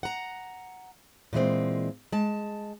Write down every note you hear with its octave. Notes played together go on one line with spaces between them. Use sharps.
F#5 A#5
A#2 E3 G#3 C4
G#3 A5